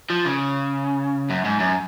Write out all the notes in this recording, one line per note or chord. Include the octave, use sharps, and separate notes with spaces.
F3
C#3
F#2
G#2
F#2